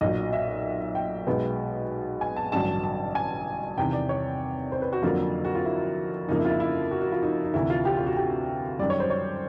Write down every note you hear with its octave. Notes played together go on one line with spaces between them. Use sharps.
B1 A#2 F#3 D#5
E5
G5
B1 B2 G#3 B3
G#5
A5
A1 G2 D3 F#3 A5
A5
G#5
E2 C3 D#3 G5
D5
C#5
C5
B4
F#4
F2 D3 F#3 A#3 F4
F#4
F4
E4
F2 C#3 F3 A#3 D#4
E4
F4
E4
E4
F#4
F#4
F4
D#4
D#4
D2 C3 E3 E4
F4
G4
F4
F#4
G4
F#2 D#3 G3 D5
C#5
C5
C#5